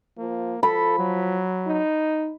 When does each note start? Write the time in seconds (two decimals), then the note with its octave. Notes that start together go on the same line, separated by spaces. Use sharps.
0.18 F3 A#3
0.63 F3 A4 B5
0.99 F#3
1.67 D#4